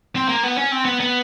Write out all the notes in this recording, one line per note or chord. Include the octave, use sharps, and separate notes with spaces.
C4
A#3
B3
C#4
C4
B3
B3